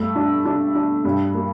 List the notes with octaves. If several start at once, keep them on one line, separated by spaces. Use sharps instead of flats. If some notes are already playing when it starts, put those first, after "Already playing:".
Already playing: G2 A3
D4
D4
D4
G2
A#3